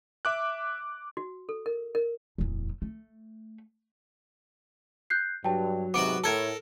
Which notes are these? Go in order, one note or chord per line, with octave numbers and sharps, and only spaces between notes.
E5 D6 F#6
F#4
A4
A#4
A#4
D1 E2
A3
F#6 G6 C7
G2 F#3 G5 A5
G#2 C3 B3 F#4 D6 D7
A2 A4 A#4 A5 G#6